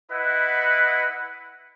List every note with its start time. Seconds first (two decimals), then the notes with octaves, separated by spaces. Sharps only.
0.10 E4 B4 D#5 F#5